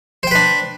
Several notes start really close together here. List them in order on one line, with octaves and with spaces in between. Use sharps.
C5 G5 B4 D4